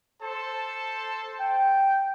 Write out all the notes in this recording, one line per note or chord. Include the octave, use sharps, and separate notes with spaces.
A4 C5 A5
G5